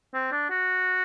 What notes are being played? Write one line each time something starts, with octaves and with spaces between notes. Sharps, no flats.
C4
D4
F#4